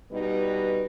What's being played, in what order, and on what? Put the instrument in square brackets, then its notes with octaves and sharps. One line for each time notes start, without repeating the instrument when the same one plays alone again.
[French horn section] B2 G3 D#4 B4